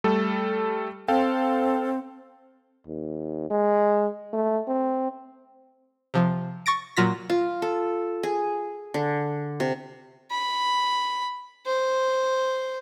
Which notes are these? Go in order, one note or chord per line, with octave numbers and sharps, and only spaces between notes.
G3 A3 A4
C4 A4 F5 G5
D#2
G#3
A3
C4
C3 F3
C#6 A6 A#6 D7
A#2 F#3 F4 A#6 B6
F4
A4
G#4
D3
C3
B5
C5